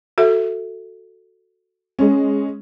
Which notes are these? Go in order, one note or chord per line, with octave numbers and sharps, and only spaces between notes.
F#4 A4 E5
G#3 C#4